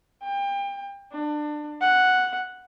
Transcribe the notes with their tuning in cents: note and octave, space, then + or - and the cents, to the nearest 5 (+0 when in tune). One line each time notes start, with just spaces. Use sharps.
G5 +30
D4 +25
F#5 +0